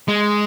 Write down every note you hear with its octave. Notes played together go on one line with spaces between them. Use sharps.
G#3